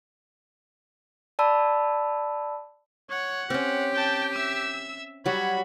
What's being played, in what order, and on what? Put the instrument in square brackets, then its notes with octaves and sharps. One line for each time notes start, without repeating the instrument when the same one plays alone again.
[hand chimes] D5 A5 B5 E6
[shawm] C#5 [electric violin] F#5
[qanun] C4 C#4 [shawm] G4
[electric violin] G5 A5
E5 E6
[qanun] F#3 G3 [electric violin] F#4 B5 [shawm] C#5